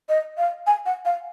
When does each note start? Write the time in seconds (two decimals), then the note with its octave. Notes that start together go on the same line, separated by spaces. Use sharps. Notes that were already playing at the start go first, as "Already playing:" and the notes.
0.09 D#5
0.38 F5
0.67 G#5
0.86 F#5
1.05 F5